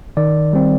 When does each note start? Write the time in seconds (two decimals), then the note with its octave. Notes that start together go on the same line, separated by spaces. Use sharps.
0.17 D#3 D5
0.53 G3 C4